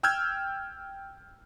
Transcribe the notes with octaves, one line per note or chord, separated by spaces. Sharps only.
G5 E6 F6 G6 G#6